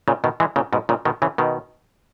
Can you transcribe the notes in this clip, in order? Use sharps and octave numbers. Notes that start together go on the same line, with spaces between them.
A#2 C#3
B2 D#3
E3 G#3
A#2 C#3
G#2 B2
A#2 C#3
B2 D#3
C#3 E3
B2 D#3